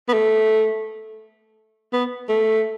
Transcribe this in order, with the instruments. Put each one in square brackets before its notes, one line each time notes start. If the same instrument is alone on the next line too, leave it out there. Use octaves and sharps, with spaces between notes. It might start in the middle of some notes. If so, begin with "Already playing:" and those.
[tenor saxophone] B3
A3
B3
A3